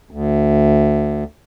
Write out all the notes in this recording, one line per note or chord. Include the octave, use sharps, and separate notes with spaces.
D2